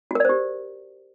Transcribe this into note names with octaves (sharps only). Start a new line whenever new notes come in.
F#4 G4 A#4 C5 D5